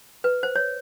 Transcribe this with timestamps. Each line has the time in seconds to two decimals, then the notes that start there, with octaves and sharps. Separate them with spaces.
0.24 B4
0.43 C5
0.56 C#5